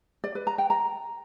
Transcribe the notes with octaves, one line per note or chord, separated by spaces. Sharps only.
D5
B4
A#5
G5
A#5